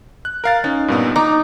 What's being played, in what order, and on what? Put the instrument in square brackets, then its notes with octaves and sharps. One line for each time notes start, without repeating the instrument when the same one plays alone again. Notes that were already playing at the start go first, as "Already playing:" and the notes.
[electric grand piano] F#6
A#4 F5 A6
[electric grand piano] C#4 [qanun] D#4
[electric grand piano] G2 A#2 B3
[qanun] D#4 [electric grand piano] A#5 D6